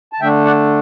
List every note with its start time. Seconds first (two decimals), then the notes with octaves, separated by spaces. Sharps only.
0.13 A5
0.21 D3 A3 D4 E5 G5
0.45 D5 F#5